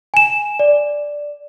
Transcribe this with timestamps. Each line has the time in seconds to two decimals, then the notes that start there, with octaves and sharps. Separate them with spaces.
0.14 G#5 E7
0.59 D5